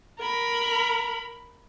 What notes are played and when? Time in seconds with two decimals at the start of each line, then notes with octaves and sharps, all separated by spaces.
0.19 A#4 B5